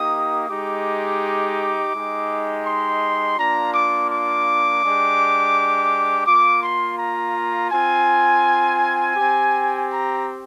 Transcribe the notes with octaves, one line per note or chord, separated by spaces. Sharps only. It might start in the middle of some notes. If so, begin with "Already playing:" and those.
Already playing: A#3 D#4 G4 D#6
G#3 D#4 G4 D6
G#3 D#4 G4
C6
A#3 D4 F4 A#5
D6
D6
G#3 D4 G4
A#3 F4 D6
C6
A#5
C4 F4 G#5
C4 G4
A#5